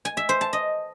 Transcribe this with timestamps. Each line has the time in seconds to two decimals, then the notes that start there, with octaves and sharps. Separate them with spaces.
0.05 G#5
0.17 E5
0.29 C5
0.41 A5
0.53 D#5